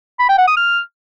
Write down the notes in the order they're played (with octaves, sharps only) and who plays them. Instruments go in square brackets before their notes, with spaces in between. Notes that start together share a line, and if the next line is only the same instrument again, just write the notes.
[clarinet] B5
G5
F#5
D#6
F6